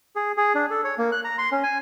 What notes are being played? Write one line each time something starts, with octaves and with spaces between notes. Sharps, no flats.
G#4
G#4
D4
A4
C#5
A#3
F#6
A#5
C6
C#4
G#5